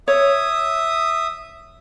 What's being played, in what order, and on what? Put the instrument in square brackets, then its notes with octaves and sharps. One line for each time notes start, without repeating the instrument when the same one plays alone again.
[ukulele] C#5 [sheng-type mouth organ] E5 D#6